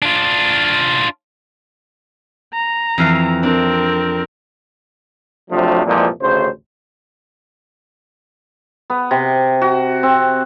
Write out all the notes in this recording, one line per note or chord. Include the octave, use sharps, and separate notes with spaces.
D4 F4
A#5
F2 E3 F5
C4 D4 A#4
C3 F3 F#3 A3 D4
C2 F2 A#2 E3 F3 G#3
A1 D2 C#3 C5
B3
C3
F#4
C4